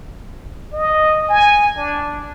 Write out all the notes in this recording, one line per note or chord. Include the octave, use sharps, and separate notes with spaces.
D#5
G#5
D4